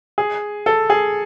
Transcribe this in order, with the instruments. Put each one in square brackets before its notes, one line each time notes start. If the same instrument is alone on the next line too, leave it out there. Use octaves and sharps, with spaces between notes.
[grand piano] G#4
A4
G#4